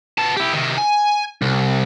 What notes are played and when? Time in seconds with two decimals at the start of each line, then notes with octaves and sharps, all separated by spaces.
0.18 B3 A5
0.37 E4 G4
0.53 C3 D#3
0.78 G#5
1.42 C2